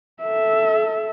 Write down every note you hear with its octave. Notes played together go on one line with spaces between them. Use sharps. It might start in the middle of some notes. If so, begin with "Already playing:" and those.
A4 E5